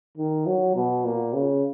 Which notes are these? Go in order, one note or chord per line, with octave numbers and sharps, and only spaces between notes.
D#3
F#3
B2
A#2
C#3